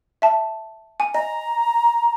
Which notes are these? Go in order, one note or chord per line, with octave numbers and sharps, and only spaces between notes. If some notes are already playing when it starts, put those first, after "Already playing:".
E5 A5
G#5
D#5 A#5